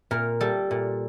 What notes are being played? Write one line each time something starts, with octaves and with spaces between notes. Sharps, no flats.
A#2 A#4
G3 A4
A#2